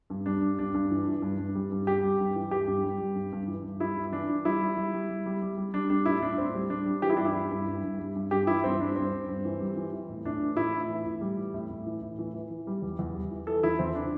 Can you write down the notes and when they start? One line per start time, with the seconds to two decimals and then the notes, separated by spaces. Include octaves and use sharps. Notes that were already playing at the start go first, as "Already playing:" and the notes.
0.10 G2
0.26 G3 D4
0.42 G2
0.58 G2 D4
0.74 G2
0.90 E3
1.07 E3
1.22 G2
1.38 G2
1.55 G3
1.72 G2
1.87 G2 G4
2.03 G3
2.20 G2
2.35 E3
2.51 G2 G4
2.67 G2
2.83 G3
3.00 G3
3.16 G2
3.32 G2
3.48 E3
3.64 G2
3.80 G3 E4
3.96 G2
4.12 E3 D4
4.28 E3
4.45 G3 E4
4.61 G3
4.77 G3
4.94 G3
5.09 G3
5.26 G3
5.42 G3
5.58 G3
5.74 G3 D4
5.90 G3 D4
6.06 A2 E4
6.22 A2 D4
6.38 A2 C4
6.54 G3
6.70 G3 D4
6.86 G3
7.02 E3 G4
7.10 E4
7.17 G2 D4
7.25 E4
7.34 G3
7.51 G2
7.67 G2
7.84 G2
7.99 G3
8.16 G2
8.31 G2 G4
8.47 E3 E4
8.64 G2 C4
8.80 G3 D4
8.96 G2 C4
9.12 G2
9.28 G2
9.45 E3
9.61 G3
9.77 E3
9.93 E3
10.09 A2
10.25 A2 D4
10.42 E3
10.57 A2 E4
10.73 A2
10.89 E3
11.06 A2
11.21 G3
11.37 E3
11.54 A2
11.70 A2
11.86 E3
12.02 A2
12.19 E3
12.34 E3
12.50 E3
12.67 G3
12.82 E2
12.99 E2
13.15 G3
13.31 E3
13.47 E3 A4
13.63 E2 E4
13.79 E2 C4
13.95 D4